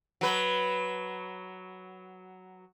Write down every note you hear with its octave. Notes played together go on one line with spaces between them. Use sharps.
F#3 B4